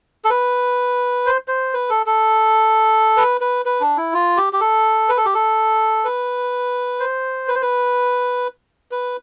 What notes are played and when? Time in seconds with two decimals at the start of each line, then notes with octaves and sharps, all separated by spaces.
0.25 A4
0.30 B4
1.26 C5
1.48 C5
1.74 B4
1.90 A4
2.06 A4
3.17 B4
3.41 B4
3.65 B4
3.81 D4
3.97 E4
4.13 F4
4.37 G4
4.53 G4
4.61 A4
5.09 B4
5.17 A4
5.25 G4
5.34 A4
6.05 B4
7.00 C5
7.48 B4
7.55 C5
7.62 B4
8.91 B4